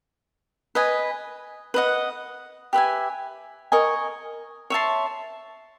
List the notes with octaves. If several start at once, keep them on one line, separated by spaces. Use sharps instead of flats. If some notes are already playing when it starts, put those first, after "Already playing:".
B4 D#5 G#5
B4 D#5 F#5
G4 B4 E5 G#5
A#4 D#5 G#5 C#6
C#5 E5 A5 C6